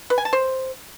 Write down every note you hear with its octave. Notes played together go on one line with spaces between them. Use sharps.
B4
G#5
A5
C5